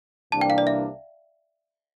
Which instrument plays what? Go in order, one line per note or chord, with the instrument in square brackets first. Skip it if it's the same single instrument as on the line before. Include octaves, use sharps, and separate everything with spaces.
[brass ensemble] C2 C3 E3 A#3 D4 [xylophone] A5
[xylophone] G5
F5
D5
E5